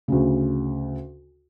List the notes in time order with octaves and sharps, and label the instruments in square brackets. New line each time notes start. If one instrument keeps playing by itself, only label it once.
[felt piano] D2 C#3